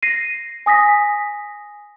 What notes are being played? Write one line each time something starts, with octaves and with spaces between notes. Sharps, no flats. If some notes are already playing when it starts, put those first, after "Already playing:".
A#6 C7 D#7
G#5 D#6 A#6 B6